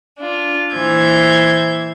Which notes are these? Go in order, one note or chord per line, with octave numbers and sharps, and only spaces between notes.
D4 F4
A#2 E3 C5 E6 G6 G#6